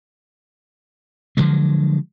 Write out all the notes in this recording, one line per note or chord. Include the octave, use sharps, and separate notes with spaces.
D3 F3 F#3 G#3